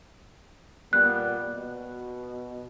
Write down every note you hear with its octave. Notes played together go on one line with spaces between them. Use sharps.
A#2 G3 B3 F#6
B2